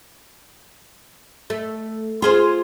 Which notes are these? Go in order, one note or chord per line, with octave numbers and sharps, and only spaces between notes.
A3
F4 G#4 C5